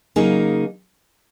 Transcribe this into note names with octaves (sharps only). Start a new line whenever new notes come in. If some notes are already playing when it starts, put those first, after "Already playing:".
C#3 F#3 A#3 D#4 G#4